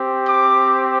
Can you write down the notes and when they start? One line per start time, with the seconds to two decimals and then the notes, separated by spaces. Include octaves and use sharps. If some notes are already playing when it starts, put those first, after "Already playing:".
Already playing: C4 G4
0.28 D6